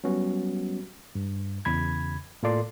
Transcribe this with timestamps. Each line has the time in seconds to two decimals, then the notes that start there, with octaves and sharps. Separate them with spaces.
0.04 F#3 G3 B3 C#4 F#4
1.15 G2
1.65 E2 C#3 B5 G#6
2.43 A2 A#3 F4 A4 D5 C6